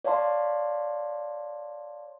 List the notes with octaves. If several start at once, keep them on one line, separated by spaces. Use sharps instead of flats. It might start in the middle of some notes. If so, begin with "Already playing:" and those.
C#5 D5 F5 A5 C6